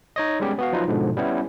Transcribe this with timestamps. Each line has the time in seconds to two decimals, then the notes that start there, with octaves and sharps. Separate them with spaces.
0.16 D#4 C#5 D#5
0.40 G3 G#3 B3 C#4 G4
0.59 B3 F#4 F5
0.72 F3 F#3 D#4 F4 B4 D#5
0.88 G#2 B2 D3 F3
1.17 G3 B3 C#4 E4